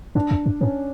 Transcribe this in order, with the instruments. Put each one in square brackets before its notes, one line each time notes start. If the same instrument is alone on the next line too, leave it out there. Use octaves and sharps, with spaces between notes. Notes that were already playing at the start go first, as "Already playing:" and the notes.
[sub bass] F#2 [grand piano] D4
[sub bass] E2
F#2
[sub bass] G#2 [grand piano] C#4